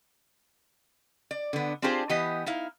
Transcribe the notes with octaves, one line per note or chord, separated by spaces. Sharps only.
D5
D3 B3
C4 D4 F4 G4 G#4 C5
E3 B3 G4 D#5
D#4 E4 F5